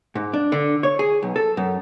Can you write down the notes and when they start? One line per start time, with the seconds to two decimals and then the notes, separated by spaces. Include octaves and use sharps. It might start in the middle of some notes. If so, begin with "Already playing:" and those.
0.15 G#2
0.33 D4
0.52 D3
0.83 C#5
0.99 G#4
1.22 B1
1.36 A4
1.57 F#2